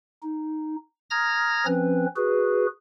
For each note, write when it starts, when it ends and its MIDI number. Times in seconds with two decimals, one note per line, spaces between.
0.23 0.76 63
1.10 1.66 82
1.10 1.66 87
1.10 1.66 89
1.10 1.66 92
1.10 1.66 94
1.66 2.06 53
1.66 2.06 60
1.66 2.06 61
1.66 2.06 71
2.16 2.66 66
2.16 2.66 68
2.16 2.66 71